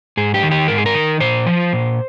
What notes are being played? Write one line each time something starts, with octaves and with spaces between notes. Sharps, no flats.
G#2 G#4
G4
D#3
G4
G#2 A#4
G#4
A#4
D#3
A#2 C5
F3
A#2